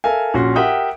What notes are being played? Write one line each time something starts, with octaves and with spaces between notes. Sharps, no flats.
A4 A#4 E5 F5 G#5
A#1 A#2 C#4 F#4 C6
G4 A#4 E5 F#5 G5 D#6